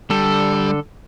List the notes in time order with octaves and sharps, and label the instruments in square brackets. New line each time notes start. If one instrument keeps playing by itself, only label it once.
[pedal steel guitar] D3 A4 [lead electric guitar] G3